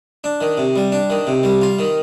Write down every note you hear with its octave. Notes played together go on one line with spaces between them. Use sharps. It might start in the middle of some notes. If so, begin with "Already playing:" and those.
D4
D#3
C3
G3
D4
D#3
C3
G3
F4
D#3